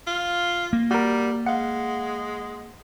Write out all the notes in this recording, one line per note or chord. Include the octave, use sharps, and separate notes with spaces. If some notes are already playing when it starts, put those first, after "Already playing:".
F4
A#3
G3 F#4 A#4
G#3 F5 F#5